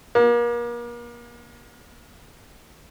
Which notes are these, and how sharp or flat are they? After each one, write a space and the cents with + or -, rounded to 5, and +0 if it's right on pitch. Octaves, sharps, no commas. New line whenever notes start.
A#3 +35